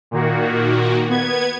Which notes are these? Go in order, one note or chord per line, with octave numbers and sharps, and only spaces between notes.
A#2 D#3 A#3 F#4
B3 G#6